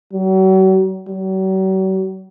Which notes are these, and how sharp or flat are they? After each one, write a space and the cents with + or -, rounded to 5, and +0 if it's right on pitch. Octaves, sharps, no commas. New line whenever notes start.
F#3 +40
F#3 +45